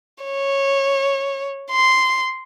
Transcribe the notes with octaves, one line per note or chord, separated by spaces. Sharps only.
C#5
C6